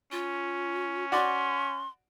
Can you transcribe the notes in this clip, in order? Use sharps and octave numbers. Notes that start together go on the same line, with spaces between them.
C#4 F4
F#4 D5 C6